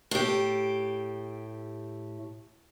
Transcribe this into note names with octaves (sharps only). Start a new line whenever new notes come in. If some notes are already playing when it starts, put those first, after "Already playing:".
A2 G4